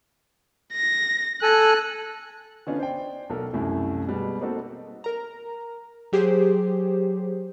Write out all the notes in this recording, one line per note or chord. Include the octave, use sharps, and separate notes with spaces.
A#6
A4 G#5 F#6
D3 B3 C#4 D#4 F4
C5 D5 G5
B1 A4 A#4
C2 F#2 A3 E4
B2 G3 G#3 B3
A#3 C4 D#4 F#4 A4
A#4 A#5
F#3 G4 G#4 C5